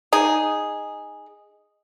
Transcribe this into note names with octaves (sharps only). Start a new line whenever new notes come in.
D#4 G#4